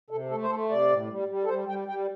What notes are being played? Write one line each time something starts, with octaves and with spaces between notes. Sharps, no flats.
C3 A4
A3 A4
C5
A3 A4
C3 D5
A2
G3
G3
A4
G3 C5
G3 G5
G3 G5